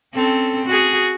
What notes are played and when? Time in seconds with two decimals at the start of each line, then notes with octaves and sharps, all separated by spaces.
0.14 C4 C#4 A4
0.66 F#4 G#4